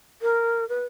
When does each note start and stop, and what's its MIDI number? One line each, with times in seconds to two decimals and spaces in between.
0.22 0.67 70
0.69 0.85 71